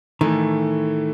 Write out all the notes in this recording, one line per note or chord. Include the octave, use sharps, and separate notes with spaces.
A2 D#3 E3 A3